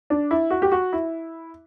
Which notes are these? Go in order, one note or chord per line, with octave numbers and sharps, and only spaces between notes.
D4
E4
F#4
G4
F#4
E4